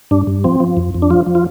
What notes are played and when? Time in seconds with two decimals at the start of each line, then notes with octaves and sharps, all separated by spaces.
0.11 G2 D4
0.27 G2
0.44 F3 C4
0.60 F3
0.77 F2
0.94 F2
1.02 D4
1.10 F3 F4
1.26 F3
1.35 F4